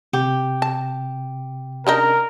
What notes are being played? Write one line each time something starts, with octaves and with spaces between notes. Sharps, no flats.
C3 G4
A5
C#3 D4 D#4 A#4